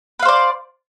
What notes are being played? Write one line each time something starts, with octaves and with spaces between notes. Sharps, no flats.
B4 C5 D5 F5